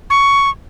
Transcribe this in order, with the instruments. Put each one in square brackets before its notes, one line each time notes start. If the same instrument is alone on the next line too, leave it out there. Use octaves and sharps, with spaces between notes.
[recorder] C#6